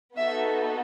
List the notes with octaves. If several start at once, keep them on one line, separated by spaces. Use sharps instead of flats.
B3 D#4 F#4 A4 E5